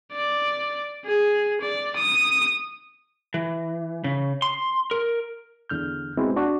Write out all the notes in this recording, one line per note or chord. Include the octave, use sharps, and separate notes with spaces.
D5
G#4
D5
D#6
E3
C#3
C6
A#4
E2 D3 F6 G6
G#3 B3 C4 E4 F#4
D4 F#4